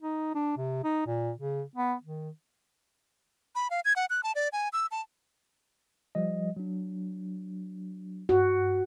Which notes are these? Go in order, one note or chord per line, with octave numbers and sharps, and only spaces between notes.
D#4
D4
C3
D#4
A#2
C#3
B3
D#3
B5
F5
G#6
F#5
F#6
A5
D5
G#5
E6
A5
F3 G3 D#5
F#3 D4
G2 F#4